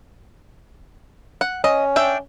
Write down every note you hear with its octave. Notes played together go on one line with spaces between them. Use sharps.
F#5
C#4 D#5
D4 E5 G5